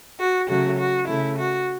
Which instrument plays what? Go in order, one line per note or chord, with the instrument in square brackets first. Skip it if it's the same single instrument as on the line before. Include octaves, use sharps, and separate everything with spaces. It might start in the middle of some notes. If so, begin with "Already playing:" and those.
[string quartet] F#4
C#3 F#3 A3 F#4
F#4
C#3 A3 E4
F#4